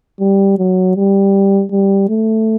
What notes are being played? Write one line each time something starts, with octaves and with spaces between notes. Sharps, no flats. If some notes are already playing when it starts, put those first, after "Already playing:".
G3
F#3
G3
G3
A3